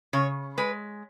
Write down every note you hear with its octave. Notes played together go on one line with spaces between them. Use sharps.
C#3 C#5
G#3 B4